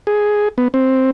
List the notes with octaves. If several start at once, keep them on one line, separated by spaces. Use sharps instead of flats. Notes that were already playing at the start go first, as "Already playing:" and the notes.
G#4
B3
C4